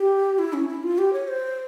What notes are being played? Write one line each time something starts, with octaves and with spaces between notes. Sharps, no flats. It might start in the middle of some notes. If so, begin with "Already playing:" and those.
Already playing: G4
E4
C#4
E4
F4
G4
C#5
C5